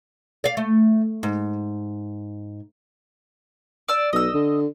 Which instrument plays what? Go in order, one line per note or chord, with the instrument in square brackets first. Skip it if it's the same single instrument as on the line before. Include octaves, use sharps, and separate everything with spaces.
[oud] D5 F5
A3
G#2
[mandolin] D5 E6
[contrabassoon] B1 [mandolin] D#5 E6
[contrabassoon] D3